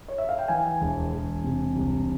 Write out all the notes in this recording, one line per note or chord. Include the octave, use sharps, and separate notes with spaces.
C#5
E5
F5
G5
E3 G#5
E1
E1
C3
C2